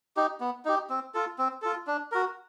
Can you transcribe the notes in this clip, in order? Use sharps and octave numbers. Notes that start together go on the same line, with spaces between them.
D#4 G4
B3
D#4 G4
C4
F4 A4
C4
F4 A4
D4
F#4 A#4